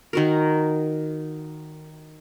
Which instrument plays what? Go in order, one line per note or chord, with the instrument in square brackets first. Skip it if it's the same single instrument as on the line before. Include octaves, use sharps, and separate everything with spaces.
[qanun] D#3 F#4 A#4